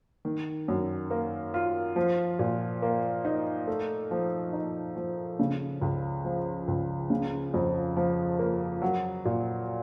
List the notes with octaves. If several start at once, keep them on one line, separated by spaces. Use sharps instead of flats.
D#3
F#2
A#3
F4
F3
A#2
A#3
D#4
A3
F3
D#4
F3
C#3
C#2
F3
C#2
C#3
F2
F3
A#3
F#3
A#2